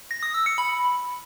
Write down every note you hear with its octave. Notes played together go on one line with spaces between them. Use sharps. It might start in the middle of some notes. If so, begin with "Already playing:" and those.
A#6
D#6
E6
C#7
B5